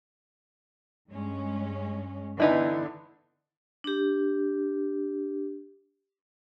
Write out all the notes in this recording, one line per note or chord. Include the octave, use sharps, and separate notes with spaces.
G2 G#3 C#4
D3 E3 B3 D#4 E4
D4 G4